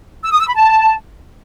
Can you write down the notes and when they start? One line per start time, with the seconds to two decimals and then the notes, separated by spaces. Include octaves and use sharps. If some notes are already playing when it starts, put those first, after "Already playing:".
0.24 E6
0.32 D#6
0.40 E6
0.47 B5
0.55 A5